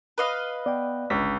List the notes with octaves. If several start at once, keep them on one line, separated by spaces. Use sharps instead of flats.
B4 D#5 F5
B3 D5 G5
G1 C#2 D4 B6